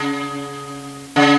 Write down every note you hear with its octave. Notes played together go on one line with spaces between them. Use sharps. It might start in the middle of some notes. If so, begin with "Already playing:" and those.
Already playing: C#3
C#3